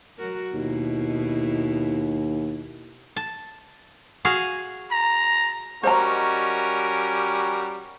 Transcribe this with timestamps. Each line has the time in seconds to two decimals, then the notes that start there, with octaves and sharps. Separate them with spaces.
0.18 F#3 F#4 A#4
0.54 D#2 B2 E4
3.16 A5
4.25 F#4 G#4 F5
4.91 A#5
5.83 G3 C#4 F#4 A#4 C5 D#5 A#5